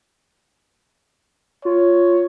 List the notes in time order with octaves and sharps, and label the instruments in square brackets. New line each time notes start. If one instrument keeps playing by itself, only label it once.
[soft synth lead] F4 [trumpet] C#5